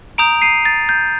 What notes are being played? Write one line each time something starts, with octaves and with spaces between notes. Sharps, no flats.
A#5 D#6 G6 D7 F7
C7 D#7
A6
G6